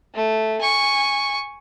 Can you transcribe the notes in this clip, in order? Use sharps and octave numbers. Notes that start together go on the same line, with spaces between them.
A3
G#5 C#6